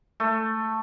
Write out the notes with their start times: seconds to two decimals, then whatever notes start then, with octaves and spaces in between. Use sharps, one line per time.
0.20 A3